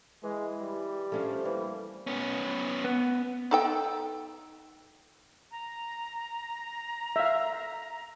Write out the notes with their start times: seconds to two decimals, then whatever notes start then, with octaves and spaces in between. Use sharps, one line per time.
0.23 E3 G#3
0.61 G3
1.12 F3 A3 C#4 D4
1.45 E3 A#3
2.07 B3 C#4
2.84 B3
3.51 D#4 A4 G5
5.51 A#5
7.16 E5 F5